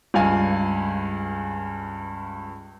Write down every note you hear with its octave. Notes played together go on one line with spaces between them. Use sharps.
C#2 G2 F5 G#5